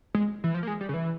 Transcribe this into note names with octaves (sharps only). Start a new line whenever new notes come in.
G#3
E3
F3
A#3
G#3
G3
C#3
E3